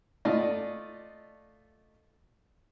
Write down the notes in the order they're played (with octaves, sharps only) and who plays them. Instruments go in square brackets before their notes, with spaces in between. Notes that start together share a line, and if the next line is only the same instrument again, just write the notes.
[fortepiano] A3 F4 D5 D#5